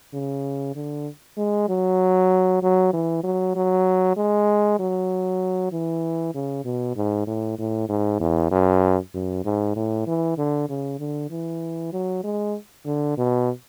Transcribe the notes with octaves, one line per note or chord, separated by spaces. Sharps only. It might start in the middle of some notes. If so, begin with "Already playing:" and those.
C#3
D3
G#3
F#3
F#3
E3
F#3
F#3
G#3
F#3
E3
C#3
B2
G#2
A2
A2
G#2
E2
F#2
F#2
G#2
A2
E3
D3
C#3
D3
E3
F#3
G#3
D3
B2